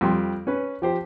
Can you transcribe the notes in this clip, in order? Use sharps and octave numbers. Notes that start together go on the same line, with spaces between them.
F2 G3 C6
C#4 B4
F3 G4 C5